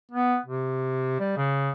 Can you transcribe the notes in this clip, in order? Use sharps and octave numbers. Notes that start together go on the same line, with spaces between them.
B3
C3
G3
C#3